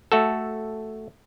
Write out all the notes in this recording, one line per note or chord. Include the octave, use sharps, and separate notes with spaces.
A3 F#4 A4